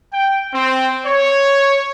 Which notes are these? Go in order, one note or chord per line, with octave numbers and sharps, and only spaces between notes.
G5
C4
C#5